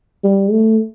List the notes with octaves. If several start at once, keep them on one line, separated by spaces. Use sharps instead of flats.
G3
A3